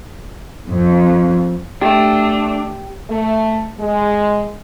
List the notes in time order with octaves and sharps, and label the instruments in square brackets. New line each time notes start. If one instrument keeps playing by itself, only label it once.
[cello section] F2
[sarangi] A3 [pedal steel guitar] D4 [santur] G4
[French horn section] A3
G#3